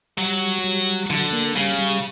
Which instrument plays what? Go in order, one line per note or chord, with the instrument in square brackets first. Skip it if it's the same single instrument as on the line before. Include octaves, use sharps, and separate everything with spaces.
[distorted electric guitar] F#3 [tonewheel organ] G3
[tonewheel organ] G3
[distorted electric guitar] D3 [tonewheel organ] F#3
[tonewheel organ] A#3
[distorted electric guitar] C#3 [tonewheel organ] G3
[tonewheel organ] G3